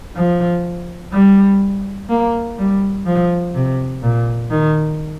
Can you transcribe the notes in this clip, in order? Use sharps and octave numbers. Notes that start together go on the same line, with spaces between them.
F3
G3
A#3
G3
F3
C3
A#2
D#3